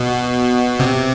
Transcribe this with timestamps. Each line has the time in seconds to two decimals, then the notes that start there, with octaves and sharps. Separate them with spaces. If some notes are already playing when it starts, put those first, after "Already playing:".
Already playing: B2
0.79 C3